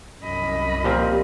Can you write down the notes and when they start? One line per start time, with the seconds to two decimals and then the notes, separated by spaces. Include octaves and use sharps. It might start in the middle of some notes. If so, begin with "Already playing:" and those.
0.22 C2 F#2 D#5 B5
0.84 A#2 F3 C4 G4